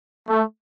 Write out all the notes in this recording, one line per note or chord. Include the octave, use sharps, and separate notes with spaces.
A3